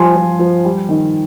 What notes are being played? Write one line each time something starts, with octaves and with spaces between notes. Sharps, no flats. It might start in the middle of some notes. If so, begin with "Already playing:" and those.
Already playing: F3 G3 G#5 C6
F3
F3
G3
D#3